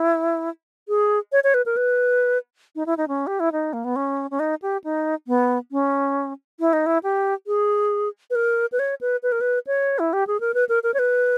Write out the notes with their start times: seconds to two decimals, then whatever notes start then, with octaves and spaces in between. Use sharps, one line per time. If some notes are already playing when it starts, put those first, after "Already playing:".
Already playing: E4
0.88 G#4
1.32 C#5
1.44 C#5
1.54 B4
1.66 A#4
1.77 B4
2.75 D#4
2.86 E4
2.98 D#4
3.08 C#4
3.27 G4
3.40 E4
3.52 D#4
3.73 A#3
3.84 B3
3.96 C#4
4.31 C#4
4.40 D#4
4.62 G4
4.84 D#4
5.28 B3
5.72 C#4
6.60 E4
6.73 D#4
6.86 E4
7.03 G4
7.47 G#4
8.30 B4
8.35 A#4
8.72 B4
8.79 C#5
9.01 B4
9.23 B4
9.32 A#4
9.41 B4
9.67 C#5
9.99 E4
10.13 G4
10.27 G#4
10.40 A#4
10.54 B4
10.69 A#4
10.83 A#4
10.94 C#5
10.99 B4